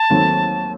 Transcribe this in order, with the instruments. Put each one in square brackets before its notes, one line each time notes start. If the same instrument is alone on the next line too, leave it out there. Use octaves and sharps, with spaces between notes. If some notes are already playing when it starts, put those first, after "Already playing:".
Already playing: [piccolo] A5
[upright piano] D#2 D#3 F#3 A3 C4